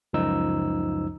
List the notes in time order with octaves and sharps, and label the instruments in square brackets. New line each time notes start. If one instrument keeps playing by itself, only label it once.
[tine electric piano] C#2 F#2 F3 D#4 E6